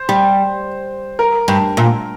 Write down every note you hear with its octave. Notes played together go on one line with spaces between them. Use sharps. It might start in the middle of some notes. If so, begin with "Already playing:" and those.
Already playing: C5
G3
A#4
G2
A#2